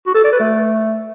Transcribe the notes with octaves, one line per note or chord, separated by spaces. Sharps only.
F#4
A4
D5
B4
A3